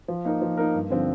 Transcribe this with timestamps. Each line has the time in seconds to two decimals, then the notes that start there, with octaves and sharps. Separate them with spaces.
0.08 F3
0.25 A#3 D#4 A#4
0.42 F3
0.57 A#3 D#4 A#4
0.74 G2
0.90 D3 F3 C4